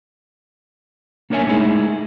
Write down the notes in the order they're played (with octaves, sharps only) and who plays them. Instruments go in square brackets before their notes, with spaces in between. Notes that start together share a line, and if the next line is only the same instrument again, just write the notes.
[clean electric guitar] A#3 D4 A#4 C#5 E5 G#5
G#3 A3 D#4 E4 G#4